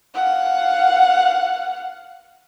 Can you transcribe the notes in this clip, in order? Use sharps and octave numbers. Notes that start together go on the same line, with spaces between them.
F5 F#5